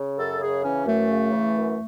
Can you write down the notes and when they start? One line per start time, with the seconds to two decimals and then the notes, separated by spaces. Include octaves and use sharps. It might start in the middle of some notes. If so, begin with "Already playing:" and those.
Already playing: C#3
0.16 F#2 A4
0.39 C#3 G#4
0.63 E3 C#4
0.86 F#2 A3
1.10 C#3
1.32 E3
1.55 F#2